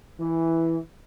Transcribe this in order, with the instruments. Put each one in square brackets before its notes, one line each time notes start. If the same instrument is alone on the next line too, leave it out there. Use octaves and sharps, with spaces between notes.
[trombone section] E3